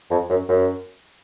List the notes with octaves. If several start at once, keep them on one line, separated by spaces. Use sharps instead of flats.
F2
F#2
F#2